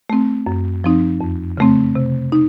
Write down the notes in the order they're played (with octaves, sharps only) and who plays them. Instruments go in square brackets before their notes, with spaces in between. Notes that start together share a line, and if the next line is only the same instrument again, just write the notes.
[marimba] A3 C4
F#2
F3 C4 D#4
F2
C#3 A3 C4
C3
D#4